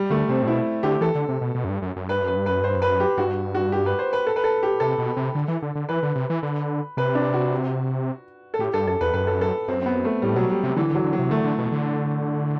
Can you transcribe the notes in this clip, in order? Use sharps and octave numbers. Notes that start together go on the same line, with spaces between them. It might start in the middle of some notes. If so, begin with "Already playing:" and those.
Already playing: G3
D3 A3
C3 C4
A2
B2 E4
D3 G4
E3 A4
D3
C3
B2
B2
F#2
G2
F#2
F#2
G2 B4
F#2
B4
G2
F#2 B4
G2 C5
F#2
B4
G4
G2 F#4
F#4
G4
B4
C5
B4
A4
B4
A4
G4
C3 A4
B2
C3
D3
E3
D3
D3
E3 B4
D3
C3
E3
D3
C3 B4
D4
F#4
A4
A2 G4
G2 A4
F#2 A4
E2 B4
F#2 B4
A4
A4
F#2 C4
C4
B3
A3
A2 G3
B2 F#3
G3
C3
D3 E3
D3
F#3
D3
F#3
C3
D3 A3
D3
B2
D3